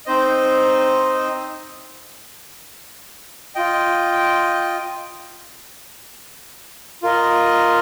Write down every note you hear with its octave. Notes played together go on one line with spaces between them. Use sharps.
C4 D#4 C5 D#5
F4 D#5 G5
F4 A#4 D#5